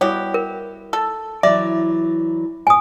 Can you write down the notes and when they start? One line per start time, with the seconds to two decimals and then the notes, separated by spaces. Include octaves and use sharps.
0.01 B2 G3 B3 E4 F#4 G4 C#5
0.34 A#4
0.93 A4
1.43 E3 F#3 D5 E5
2.67 A#2 G#5 D#6